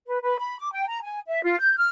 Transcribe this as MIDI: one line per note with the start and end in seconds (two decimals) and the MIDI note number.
0.06 0.18 71
0.23 0.36 71
0.38 0.56 83
0.60 0.72 86
0.72 0.88 79
0.88 0.99 82
1.03 1.19 80
1.27 1.43 76
1.44 1.56 65
1.59 1.77 91
1.77 1.89 89